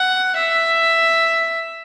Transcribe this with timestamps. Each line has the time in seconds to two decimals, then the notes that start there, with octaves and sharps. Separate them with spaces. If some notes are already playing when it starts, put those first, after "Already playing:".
Already playing: F#5
0.35 E5